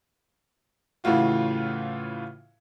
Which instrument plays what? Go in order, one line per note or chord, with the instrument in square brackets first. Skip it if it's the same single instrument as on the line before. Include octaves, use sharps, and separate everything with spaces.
[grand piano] A2 C#3 E3 A3 F4 F#4